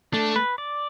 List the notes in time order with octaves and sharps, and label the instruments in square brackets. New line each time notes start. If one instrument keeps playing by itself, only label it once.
[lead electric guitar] A3 [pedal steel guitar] D4
[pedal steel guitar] B4
D5